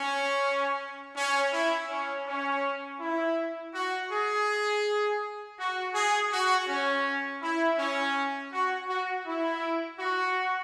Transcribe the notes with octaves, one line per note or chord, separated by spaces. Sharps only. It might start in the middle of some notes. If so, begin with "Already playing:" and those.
Already playing: C#4
C#4
E4
C#4
C#4
E4
F#4
G#4
F#4
G#4
F#4
C#4
E4
C#4
F#4
F#4
E4
F#4